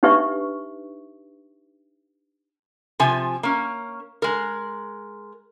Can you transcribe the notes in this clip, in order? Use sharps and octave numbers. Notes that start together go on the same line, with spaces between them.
D4 D#4 G4 B4 E5 C#6
C3 F3 G#5
A#3 C#4
G#3 A#4